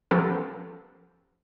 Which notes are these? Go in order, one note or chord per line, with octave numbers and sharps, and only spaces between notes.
F3 B3 C#4 G4 A4 A#4